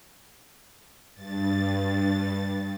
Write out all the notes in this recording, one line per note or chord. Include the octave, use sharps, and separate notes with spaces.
G2 A6